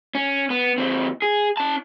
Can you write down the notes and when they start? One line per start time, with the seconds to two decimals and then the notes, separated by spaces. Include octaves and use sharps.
0.15 C#4
0.50 B3
0.78 D#2 C4
1.22 G#4
1.57 C#4 A5